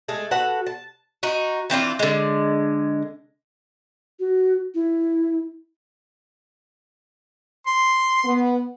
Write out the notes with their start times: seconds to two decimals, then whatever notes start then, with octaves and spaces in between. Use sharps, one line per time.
0.08 G#3 A3 G#4 A4
0.31 F#4 A4 B4 F#5
0.66 A5
1.23 D#4 F#4
1.70 E3 C4 D4 F4
1.99 D3 G#3
4.20 F#4
4.75 E4
7.66 C6
8.23 B3